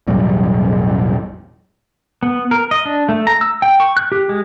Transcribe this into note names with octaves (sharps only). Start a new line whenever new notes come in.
E1 A1 F#3 G3
B3
A#4
D#5
D4
A3
A#5
E6
G5
C#6
F#6
G4
G#3